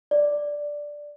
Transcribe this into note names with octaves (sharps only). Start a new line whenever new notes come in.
D5